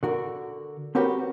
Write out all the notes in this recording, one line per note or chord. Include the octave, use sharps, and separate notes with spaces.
D3 F#4 A#4
C4 C#4 F#4 G4 A#4 B4